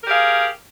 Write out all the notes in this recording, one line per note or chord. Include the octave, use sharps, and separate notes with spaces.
G4 G#4 A#4 F5